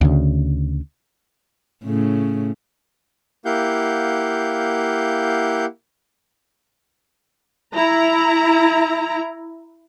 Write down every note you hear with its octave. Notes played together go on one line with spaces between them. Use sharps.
D2 C#3
A2 C#3
A#3 E4 G4 F5 F#5 G6
E4 A#5